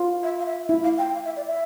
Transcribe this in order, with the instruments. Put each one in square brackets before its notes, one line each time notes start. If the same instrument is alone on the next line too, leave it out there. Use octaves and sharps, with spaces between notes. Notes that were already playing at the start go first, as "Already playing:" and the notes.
Already playing: [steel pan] F4
[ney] E5
F5
E5
[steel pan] E4 [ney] E5
[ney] F5
G5
F5
E5
D5
E5